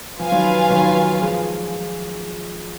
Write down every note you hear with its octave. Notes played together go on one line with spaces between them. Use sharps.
F3 F4 B4 F5 G#5
D#3 F#3
D#3 F#3
F3 G#3